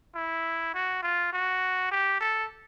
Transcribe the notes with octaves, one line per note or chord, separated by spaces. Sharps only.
E4
F#4
F4
F#4
G4
A4